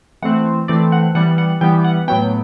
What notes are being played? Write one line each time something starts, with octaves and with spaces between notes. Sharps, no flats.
E3 A3 C4 F#5
E3 A3 C4 D5
F#5
E3 G3 B3 F#5
F#5
E3 G3 B3 G5
F#5
A2 F#3 B3 G5